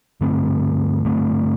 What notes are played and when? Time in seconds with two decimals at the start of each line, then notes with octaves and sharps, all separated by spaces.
0.21 G2 D3 A3 C4
1.05 G2 D3 A3 C4